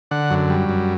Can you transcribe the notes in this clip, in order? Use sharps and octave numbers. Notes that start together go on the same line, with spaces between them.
D3 F#5
F#2
G3
F#2